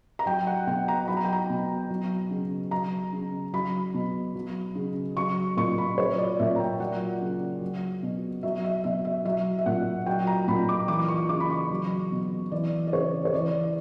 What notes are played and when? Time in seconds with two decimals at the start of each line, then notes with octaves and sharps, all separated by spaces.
0.19 A#5
0.26 F#3 G5
0.47 F#5
0.67 B2 G5
0.88 A#5
1.08 F#3 B5
1.17 A#5
1.25 G5
1.33 A#5
1.50 B2
1.90 F#3
2.30 C#3
2.71 F#3 A#5
3.13 C#3
3.53 F#3 B5
3.94 B2
4.35 F#3
4.75 C#3
5.17 F#3 C#6
5.57 A#2 C#6
5.78 B5
5.98 F#3 C#5
6.18 D5
6.40 A#2 E5
6.56 A#5
6.60 G5
6.80 F#3 F#5
7.21 C#3
7.62 F#3
8.03 B2
8.43 F#3 E5
8.64 E5
8.84 B2 E5
9.05 E5
9.25 F#3 E5
9.59 E5
9.66 A#2 F#5
10.06 F#3 G5
10.27 A#5
10.48 A#2 B5
10.69 D6
10.88 E3 D6
11.08 C#6
11.29 C#3 D6
11.40 B5
11.50 C#6
11.70 F#3
12.12 B2
12.52 E3 D5
12.87 D5
12.93 C#3 C#5
13.25 C#5
13.34 E3 D5